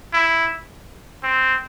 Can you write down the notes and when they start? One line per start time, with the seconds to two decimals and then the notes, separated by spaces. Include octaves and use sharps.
0.13 E4
1.23 C4